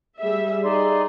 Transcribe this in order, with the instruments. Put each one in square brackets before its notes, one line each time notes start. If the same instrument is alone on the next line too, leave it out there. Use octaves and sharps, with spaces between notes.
[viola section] G3 G#4 E5
[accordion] D#4 D5 C6 [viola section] G#4